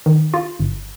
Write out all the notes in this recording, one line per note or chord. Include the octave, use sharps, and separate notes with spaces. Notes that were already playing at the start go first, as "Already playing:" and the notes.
D#3
F4
G1